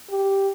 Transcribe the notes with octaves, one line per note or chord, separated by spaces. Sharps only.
G4